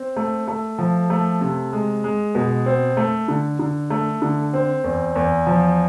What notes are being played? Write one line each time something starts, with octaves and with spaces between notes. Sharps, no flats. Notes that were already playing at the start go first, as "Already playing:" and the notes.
Already playing: C4
A3
A3
F3
A3
C3
G#3
G#3
B2
C4
A3
D3
D3
A3
D3
C4
E2
E2
F3